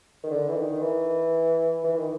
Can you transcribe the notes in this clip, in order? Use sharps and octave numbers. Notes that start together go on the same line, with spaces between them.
D#3
D3
E3
D#3
D#3
E3
E3
D#3